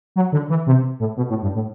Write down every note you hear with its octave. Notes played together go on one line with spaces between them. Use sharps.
F#3
D3
E3
C3
A2
B2
A2
G2
A2